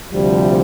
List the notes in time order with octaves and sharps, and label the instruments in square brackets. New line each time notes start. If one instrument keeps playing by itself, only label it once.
[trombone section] D2 C3 F3 G3